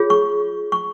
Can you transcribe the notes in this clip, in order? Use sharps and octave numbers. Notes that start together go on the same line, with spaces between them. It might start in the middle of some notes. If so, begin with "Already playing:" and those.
Already playing: F4 G#4 C#5
C#6
C#6